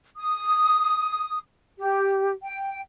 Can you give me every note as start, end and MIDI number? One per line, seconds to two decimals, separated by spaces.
0.16 1.37 87
1.80 2.32 67
2.43 2.80 79